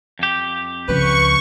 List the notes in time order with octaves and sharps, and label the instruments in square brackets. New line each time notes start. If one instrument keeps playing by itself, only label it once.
[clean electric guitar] F2 G4
[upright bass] C#2 F3 [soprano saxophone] B4 [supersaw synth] C#6